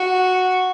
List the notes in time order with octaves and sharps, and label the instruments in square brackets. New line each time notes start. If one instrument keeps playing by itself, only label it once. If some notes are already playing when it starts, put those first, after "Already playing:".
Already playing: [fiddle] F#4